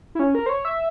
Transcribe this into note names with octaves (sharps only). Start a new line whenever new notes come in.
E4
C#4
A#4
C5
C#5
E5